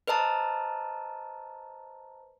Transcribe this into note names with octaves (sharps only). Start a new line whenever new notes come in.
B4 C5 D#5 A5 A#5